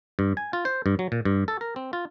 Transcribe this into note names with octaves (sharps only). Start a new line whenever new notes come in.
G2
G#5
F4
C5
G2
F#3
A#2
G2
A4
A#4
C4
F4